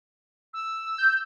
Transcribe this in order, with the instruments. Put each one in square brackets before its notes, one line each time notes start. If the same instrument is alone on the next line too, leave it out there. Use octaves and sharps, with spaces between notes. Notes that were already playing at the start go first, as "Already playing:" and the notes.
[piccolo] E6
[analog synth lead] G6